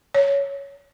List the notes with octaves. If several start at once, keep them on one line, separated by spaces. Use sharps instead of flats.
C#5